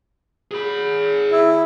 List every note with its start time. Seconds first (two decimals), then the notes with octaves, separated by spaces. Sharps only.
0.51 G#4 B5
1.31 E4